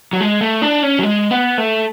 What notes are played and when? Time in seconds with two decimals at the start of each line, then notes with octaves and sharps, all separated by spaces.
0.13 F#3
0.20 G#3
0.41 A3
0.62 D4
0.83 C#4
0.99 F#3
1.03 G#3
1.31 B3
1.58 A3